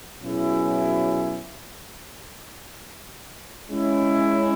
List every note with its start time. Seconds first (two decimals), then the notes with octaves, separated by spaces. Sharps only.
0.22 B2 F#3 C#4 E4 G#4
3.70 G#3 C#4 E4